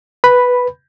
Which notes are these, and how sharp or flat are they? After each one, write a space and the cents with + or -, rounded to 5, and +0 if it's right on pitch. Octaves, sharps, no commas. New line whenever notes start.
B4 +0 B5 +0